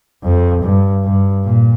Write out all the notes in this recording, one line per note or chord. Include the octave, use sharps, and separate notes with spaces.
F2
G2
G2
A#2